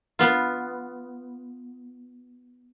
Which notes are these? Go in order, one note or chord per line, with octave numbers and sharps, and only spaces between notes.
B3 F4